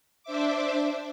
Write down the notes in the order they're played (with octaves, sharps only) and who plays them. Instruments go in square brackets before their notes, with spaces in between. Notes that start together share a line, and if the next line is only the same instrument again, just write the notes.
[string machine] D4 C5 E5 D6